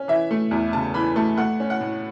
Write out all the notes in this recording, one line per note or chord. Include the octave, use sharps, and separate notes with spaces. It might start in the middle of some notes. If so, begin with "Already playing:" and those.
Already playing: C#4
E3 E5
A3
E2
C#3 A5
E3 B5
A3 A5
A3 F#5
C#4
F#5
A2